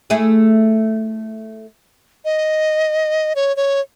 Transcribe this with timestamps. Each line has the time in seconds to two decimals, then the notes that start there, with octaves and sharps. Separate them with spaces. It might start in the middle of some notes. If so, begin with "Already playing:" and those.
0.10 A3 E4 G#4
2.25 D#5
3.35 C#5
3.56 C#5